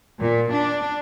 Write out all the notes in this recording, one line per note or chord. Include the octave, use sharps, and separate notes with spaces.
A#2
D4